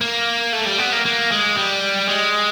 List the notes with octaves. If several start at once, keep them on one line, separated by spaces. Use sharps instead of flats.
A#3
A3
G3
B3
A#3
A#3
G#3
G3
G#3